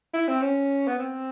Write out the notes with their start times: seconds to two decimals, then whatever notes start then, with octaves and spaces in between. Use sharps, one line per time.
0.14 E4
0.28 C4
0.42 C#4
0.87 B3
0.99 C4